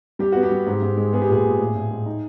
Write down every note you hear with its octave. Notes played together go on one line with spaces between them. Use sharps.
G3 G4
B3 F#4
G4
G3
G#2
G#2
G#3
B3 G#4
G4
A#2 G#4
A#2
A2
A2
G#3
D#4